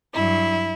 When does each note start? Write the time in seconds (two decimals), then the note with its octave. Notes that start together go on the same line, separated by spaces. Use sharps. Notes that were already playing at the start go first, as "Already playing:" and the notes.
0.14 G2 F#3 E4